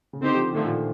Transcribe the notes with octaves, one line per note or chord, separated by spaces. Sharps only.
C#3
D3 C4 D#4 G4 C5
F3
D3 D#3 F3 A3
A#2